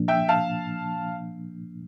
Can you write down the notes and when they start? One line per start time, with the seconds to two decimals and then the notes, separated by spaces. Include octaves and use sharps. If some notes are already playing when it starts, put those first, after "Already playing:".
Already playing: A#2 F3 A#3 D4
0.08 E5 G5
0.29 F5 A5